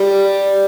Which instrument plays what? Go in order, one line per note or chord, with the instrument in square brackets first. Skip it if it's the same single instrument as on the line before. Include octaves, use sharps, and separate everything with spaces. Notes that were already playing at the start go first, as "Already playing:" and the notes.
Already playing: [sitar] G3